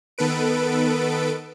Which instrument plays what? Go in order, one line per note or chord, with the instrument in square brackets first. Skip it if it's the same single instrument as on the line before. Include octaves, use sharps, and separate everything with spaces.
[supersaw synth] D#3 B3 A4 B4 D7